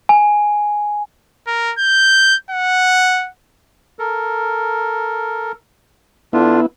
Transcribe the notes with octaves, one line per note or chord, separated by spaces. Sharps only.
G#5
A#4
G6
F#5
A4 A#4
D3 B3 D4 E4 F4